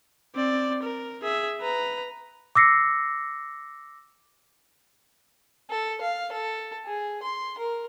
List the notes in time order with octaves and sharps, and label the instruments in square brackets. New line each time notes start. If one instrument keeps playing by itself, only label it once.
[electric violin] C4 D5
A#4
G#4 E5
B4 A#5
[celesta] D6 E6 A#6 C7 C#7
[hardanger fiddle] A4
F5
A4
G#4
C6
A#4